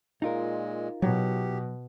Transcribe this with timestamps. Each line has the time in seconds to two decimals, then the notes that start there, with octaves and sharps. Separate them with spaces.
0.22 A#2 G#3 D#4 F4 A#4
1.02 B2 F#3 G4